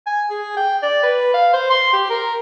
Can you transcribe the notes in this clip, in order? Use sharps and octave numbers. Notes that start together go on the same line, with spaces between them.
G#5
G#4
G5
D5
B4
F5
C5
C6
G4
A#4